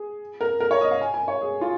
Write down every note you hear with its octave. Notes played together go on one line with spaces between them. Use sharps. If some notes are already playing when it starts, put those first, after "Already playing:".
Already playing: G#4
A#4
A#4
C#5
D#5
F5
G#5
G#5
C#5
G#4
F4